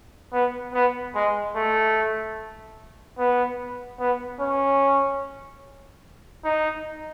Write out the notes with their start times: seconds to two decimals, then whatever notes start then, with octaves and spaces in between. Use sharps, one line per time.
0.33 B3
0.74 B3
1.15 G#3
1.56 A3
3.18 B3
4.00 B3
4.40 C#4
6.44 D#4